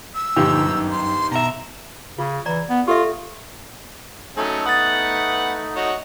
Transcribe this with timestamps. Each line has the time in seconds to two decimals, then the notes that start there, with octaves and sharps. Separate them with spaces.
0.15 E6
0.36 G1 A#2 D3 D#3 F3 G4
0.66 F#2
0.91 C6
1.32 B2 E5 A#5
2.19 C#3 F4
2.46 E3 D5 A#5
2.70 B3
2.87 F4 G4 A4 E5
4.37 F#3 A3 C#4 D#4 A4
4.66 B4 F#5 D#6 A6
5.76 F#4 C#5 D#5